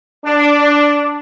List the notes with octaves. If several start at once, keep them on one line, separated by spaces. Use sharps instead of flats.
D4